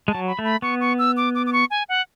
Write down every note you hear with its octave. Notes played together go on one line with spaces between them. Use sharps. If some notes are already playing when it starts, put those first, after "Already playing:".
G#3 A5
F#3
B5
A3
B5
B3 C#6
C#6
E6
D6
D6
D6
C#6
G#5
F#5